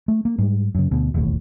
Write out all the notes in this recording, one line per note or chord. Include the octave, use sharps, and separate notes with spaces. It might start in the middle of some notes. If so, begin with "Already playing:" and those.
A3
A#3
G#2 G3
F#2 C#3
D2 B2
E1 A1 D#2 A2